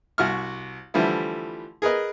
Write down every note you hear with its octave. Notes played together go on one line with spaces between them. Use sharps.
C2 F#4 E5 C#6 F6
D3 E3 F3 G3 A3 E4
G#4 A#4 B4 D#5